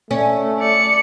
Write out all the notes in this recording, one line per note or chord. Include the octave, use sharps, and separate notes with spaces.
A3 C#4
D5 C#7